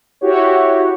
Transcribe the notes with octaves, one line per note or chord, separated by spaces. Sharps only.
E4 F#4 G4 C#5